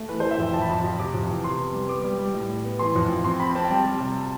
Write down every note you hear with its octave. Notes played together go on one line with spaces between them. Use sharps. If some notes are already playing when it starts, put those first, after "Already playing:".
Already playing: A3
E3 B4
C5
E3
E5
F2 G5
F2 A5
B5
F2 A5
F2
C3 D6
F2
E3
C3 C6
B3
G3
B3 D6
G3
G3
A2
A2
B3
E3 C6
F2
F2
C4 C6
C4 B5
C4 A5
G5
G3 A5
G3
C3